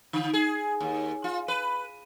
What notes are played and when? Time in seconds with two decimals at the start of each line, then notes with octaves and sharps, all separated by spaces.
0.13 D3
0.33 G#4
0.80 D#2
1.24 F4
1.48 B4